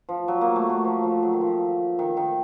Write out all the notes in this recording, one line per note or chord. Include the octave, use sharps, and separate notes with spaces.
F3
F#3
A#3
A3
F#3
F3
F3
F#3
D#3
F3
D#3
D#3